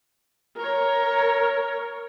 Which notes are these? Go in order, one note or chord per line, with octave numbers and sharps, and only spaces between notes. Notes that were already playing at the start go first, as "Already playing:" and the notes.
A#4 C#5